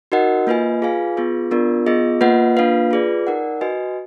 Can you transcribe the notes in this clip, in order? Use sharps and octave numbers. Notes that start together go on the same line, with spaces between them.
D#4 F#4 A#4 D#5 F#5
A#3 F4 B4 D#5 G#5
F4 G#4 B4 F5 G#5
B3 F4 G#4 B4
B3 D4 F4 A#4 D5
B3 F4 G#4 D#5
A#3 F4 B4 D#5 F#5
A#3 D4 F4 B4 F5
F4 G#4 B4 D5
D#4 A#4 D5 F#5
F#4 B4 D#5 G#5